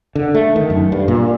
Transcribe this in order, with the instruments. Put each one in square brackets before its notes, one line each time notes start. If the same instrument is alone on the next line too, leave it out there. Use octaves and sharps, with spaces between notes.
[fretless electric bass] D3
A3
D#3
F#2
G2
A#2